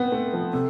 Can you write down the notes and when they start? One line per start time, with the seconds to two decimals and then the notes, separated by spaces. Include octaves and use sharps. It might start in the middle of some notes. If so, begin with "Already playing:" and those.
Already playing: B3 C4 B4
0.12 A3
0.33 F3
0.53 C3 A4